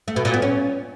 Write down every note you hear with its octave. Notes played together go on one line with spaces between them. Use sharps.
A3
B2
A#2
B3
C#4